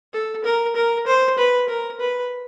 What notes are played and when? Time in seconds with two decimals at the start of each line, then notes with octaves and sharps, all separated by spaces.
0.13 A4
0.44 A#4
0.76 A#4
1.07 C5
1.38 B4
1.68 A#4
2.00 B4